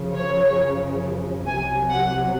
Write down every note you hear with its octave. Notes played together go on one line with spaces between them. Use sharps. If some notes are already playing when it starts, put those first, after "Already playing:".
Already playing: F#2 C#3 F3
C#5
C2 C3 F#3 G#5
F#5